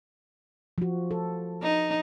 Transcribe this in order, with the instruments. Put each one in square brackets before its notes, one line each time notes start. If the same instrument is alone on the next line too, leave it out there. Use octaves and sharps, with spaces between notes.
[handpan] F3 F#4
A4
[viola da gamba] D#4